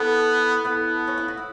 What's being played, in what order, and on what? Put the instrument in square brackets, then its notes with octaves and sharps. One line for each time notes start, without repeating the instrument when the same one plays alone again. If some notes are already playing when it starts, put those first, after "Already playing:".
Already playing: [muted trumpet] B3 [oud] E4 A4
[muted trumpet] B3 [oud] E4 A4
[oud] C#4
E4
F#4
E4